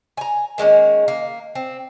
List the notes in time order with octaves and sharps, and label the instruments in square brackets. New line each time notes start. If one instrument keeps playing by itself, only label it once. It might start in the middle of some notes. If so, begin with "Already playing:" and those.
[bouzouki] G#5 A#5
D#3 G#3 A#3 C#4
A#3
C4